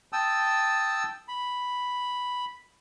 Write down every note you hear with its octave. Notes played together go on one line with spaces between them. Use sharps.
G5 A5 D#6 E6
B5